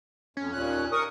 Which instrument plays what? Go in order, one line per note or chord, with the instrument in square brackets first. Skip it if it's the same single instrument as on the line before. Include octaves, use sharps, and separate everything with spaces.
[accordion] F2 [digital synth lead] C#4
[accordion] D#2 A#2 F#6
A#4 C#6 D#6